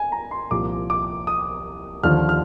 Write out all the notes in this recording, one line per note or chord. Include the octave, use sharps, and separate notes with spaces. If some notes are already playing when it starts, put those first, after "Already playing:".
Already playing: G#5
A#5
C6
C2 A#2 F3 D6
D6
D#6
D#2 D3 F3 F6
F6